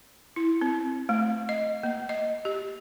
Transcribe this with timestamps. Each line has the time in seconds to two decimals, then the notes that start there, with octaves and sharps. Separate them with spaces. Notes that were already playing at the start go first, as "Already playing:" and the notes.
0.36 E4
0.61 C4
1.09 A3
1.49 D#5
1.83 A#3
2.09 D#5
2.45 G4